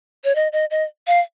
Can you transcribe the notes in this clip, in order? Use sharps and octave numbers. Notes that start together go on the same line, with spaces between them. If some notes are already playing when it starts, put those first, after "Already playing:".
C#5
D#5
D#5
D#5
F5